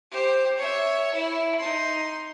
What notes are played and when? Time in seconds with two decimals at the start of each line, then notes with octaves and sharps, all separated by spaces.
0.11 G4 C5
0.57 C#5 E5
1.14 E4
1.58 D#4 C6